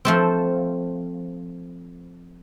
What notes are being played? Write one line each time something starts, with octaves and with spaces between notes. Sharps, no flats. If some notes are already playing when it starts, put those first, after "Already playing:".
F3 A3 C4